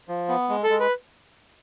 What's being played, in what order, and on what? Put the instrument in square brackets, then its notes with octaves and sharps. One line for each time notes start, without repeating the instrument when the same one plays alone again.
[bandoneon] F3
B3
G#3
[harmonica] A4
[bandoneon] G#3
[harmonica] B4